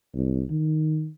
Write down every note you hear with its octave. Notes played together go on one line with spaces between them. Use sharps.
C2
D#3